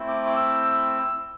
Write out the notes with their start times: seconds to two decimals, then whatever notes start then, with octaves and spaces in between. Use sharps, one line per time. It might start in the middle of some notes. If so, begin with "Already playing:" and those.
Already playing: A3 C4 E4
0.08 D6
0.26 D6
0.36 E6